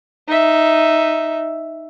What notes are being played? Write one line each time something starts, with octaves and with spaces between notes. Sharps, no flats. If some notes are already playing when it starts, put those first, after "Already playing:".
D#4 E5